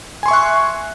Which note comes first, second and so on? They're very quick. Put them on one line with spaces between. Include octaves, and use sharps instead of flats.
G#5 C6 C#6 E5 F#6